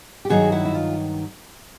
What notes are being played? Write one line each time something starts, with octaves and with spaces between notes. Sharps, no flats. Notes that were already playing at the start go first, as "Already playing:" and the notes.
G4
G2 D#3 F#3 B3 D#4 F#4 G#4
E4 F#4
E4
F4